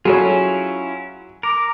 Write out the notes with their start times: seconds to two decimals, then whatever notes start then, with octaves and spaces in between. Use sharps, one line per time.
0.05 F#3 C#4 E4 F4 G#4 A4 C#5
1.43 A#4 D6